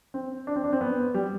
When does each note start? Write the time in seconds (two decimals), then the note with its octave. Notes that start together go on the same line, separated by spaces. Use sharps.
0.14 C4
0.47 D4
0.56 C4
0.64 D4
0.73 C4
0.81 B3
1.14 G3